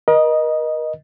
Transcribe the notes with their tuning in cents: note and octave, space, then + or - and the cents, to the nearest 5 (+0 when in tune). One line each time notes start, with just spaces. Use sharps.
A#4 +40 D#5 -5